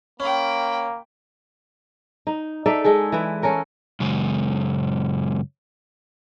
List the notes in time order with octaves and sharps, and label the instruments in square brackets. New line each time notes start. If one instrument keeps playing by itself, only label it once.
[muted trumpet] A#3 [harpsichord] C#4 [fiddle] G5 B5
[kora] D#4
D#4 A4 D5 E5
G#3 G#4 A4
E3 E4
C#4 A4 A#4 C#5
[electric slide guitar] F#2 C#3 G#3